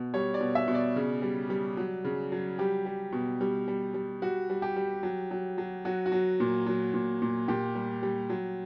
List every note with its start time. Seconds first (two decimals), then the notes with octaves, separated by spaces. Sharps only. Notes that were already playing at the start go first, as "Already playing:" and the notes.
Already playing: B2
0.14 G3 C#5
0.34 D5
0.41 B2
0.55 E5
0.68 B2
0.75 D5
0.96 C#3
1.22 G3
1.50 G3
1.77 F#3
2.04 C#3
2.32 F#3
2.59 G3 G4
2.86 G3
3.13 B2
3.41 G3
3.68 G3
3.94 G3
4.22 G3 F#4
4.50 G3
4.62 G4
4.76 G3
5.03 F#3
5.31 F#3
5.58 F#3
5.85 F#3 F#4
6.06 F#4
6.12 F#3
6.40 A#2
6.66 F#3
6.94 A#2
7.22 A#2
7.48 A#2 G4
7.75 G3
8.03 G3
8.30 F#3